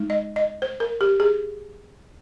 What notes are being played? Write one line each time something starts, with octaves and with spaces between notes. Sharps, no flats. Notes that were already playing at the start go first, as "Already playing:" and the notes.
Already playing: G#3 D#4
D#5
D#5
C5
A#4
G4
G#4